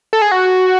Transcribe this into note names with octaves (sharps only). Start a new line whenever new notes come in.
A4
G#4
F#4